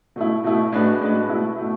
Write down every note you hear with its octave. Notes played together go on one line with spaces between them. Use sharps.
B2 A3 E4
B2 A3 E4
A2 G#3 D4 F#4 B4
A2 G#3 D4 F#4 B4
B2 A3 E4
B2 A3 E4